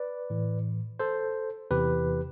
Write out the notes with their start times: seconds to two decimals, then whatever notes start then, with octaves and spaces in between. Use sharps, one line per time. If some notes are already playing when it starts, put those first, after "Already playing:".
Already playing: B4 D5
0.30 A2 E3
0.99 A4 C5
1.70 E2 C3 E3 G4 B4